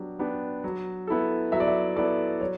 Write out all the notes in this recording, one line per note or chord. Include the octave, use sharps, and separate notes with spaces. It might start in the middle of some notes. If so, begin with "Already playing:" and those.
Already playing: F#3 B3 D4 G4
B3 D4 G4
F#3
B3 E4 A4
F#3 E5
D5
E5
B3 E4 A4 D5
F#3 C#5